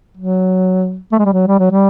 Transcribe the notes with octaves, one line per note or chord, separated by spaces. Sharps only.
F#3
A3
G#3
G3
F#3
G3
F#3
G3